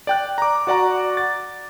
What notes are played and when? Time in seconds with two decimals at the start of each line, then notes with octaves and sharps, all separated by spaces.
0.07 D5 G5 F#6
0.38 A#5 D6
0.67 F#4 D5 F#5 A#5
1.17 A6